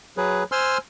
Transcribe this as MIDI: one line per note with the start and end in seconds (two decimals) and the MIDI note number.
0.17 0.44 54
0.17 0.44 68
0.17 0.44 71
0.52 0.78 72
0.52 0.78 80
0.52 0.78 84
0.52 0.78 88
0.52 0.78 89